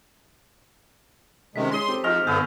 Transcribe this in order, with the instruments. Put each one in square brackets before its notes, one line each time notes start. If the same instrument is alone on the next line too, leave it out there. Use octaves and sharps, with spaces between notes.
[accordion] C3 D#3 G#3 [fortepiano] A3 C#4 [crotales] B6
[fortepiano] G#3 C#5 [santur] A#5 D#6 [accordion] C6
[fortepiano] C4 G4 A4
[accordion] F3 [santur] G#3 D#4 F4 [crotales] F6 F7
[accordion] G2 D3 B3 [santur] G#4 B4 [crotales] C#6 E6 G6